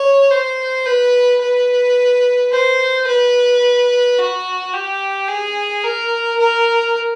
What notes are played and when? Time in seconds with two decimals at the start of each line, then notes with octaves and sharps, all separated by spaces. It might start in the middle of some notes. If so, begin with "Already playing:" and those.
Already playing: C#5
0.30 C5
0.86 B4
1.41 B4
2.52 C5
3.06 B4
4.18 F#4
4.73 G4
5.28 G#4
5.83 A#4
6.39 A#4